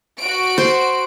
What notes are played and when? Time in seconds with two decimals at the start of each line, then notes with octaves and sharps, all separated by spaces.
0.19 F#4 D7
0.58 C5